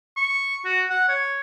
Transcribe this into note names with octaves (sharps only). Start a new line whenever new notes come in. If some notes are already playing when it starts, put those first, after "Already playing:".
C#6
F#4
F#5
C#5